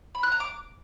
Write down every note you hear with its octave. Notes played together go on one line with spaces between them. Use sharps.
B5
F#6
A#5
D6